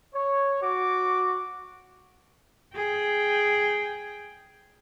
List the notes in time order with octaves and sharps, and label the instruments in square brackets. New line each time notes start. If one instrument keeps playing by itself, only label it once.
[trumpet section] C#5
F#4 D6
[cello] G#4 G5